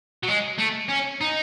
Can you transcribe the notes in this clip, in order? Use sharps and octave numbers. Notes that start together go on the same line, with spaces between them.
F#3
G#3
A3
C#4
D#4